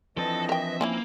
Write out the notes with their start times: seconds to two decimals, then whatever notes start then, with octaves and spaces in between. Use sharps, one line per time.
0.17 E3 F3 C4 D4 A4 D#5 A5
0.49 A#4 E5 G5
0.81 E3 A#3 C#4 E4